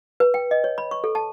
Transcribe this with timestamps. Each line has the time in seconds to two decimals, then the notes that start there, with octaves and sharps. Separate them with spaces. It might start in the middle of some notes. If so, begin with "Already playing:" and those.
0.20 B4
0.34 G5
0.51 D#5
0.64 C#5
0.78 B5
0.91 C#6
1.04 A4
1.15 A5